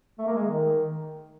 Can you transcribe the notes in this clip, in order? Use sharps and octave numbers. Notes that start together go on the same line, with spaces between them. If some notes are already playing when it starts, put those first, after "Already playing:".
A3
A#3
G#3
D#3